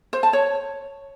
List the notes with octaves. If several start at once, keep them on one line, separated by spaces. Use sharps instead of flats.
C5
A5
C#5